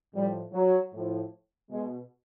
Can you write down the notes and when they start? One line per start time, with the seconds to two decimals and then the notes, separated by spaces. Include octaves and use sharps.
0.14 A2 F3 G3
0.53 F#3
0.92 A2 F3
1.70 B2 G#3